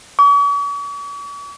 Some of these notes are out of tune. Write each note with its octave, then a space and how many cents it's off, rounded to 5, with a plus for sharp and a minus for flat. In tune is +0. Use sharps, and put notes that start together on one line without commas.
C#6 +45